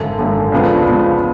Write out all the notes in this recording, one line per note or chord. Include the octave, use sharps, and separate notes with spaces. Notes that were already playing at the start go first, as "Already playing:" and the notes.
Already playing: G#1 F#2 D3
G#1 F#2 D3
C#2 C#3 F3 B3 D4
C#2 C#3 F3 B3 D4